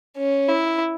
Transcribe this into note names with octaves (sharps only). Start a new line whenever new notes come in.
C#4
E4